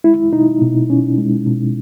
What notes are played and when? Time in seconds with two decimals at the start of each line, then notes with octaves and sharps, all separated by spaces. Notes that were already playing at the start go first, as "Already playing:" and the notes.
0.04 G#3 E4
0.33 B2 D#4
0.61 B2
0.90 C#4
1.18 G#3
1.46 B2